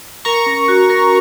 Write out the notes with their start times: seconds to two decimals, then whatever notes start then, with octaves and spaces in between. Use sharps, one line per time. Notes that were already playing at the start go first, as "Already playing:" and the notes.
0.25 A#4 A#5 C#6
0.46 C#4
0.68 F#4
0.90 A#4